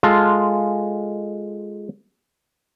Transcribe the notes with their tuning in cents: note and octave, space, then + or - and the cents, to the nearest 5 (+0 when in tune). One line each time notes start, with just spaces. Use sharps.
G#3 +0 F4 +0 A4 +0